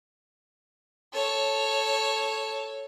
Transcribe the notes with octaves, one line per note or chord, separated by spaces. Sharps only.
A4 C#5